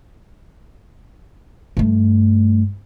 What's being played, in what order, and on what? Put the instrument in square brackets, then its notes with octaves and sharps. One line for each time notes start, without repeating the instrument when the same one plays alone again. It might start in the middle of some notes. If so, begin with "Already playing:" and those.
[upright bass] G2 A3